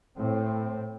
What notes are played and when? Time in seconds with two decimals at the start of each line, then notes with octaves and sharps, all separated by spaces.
0.17 A2 C4